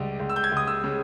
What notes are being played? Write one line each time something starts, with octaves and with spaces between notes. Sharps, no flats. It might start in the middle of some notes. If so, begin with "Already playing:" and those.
Already playing: C#2 G3
C#2
E6
G6
G#6
C#2
D#6
E6
C#3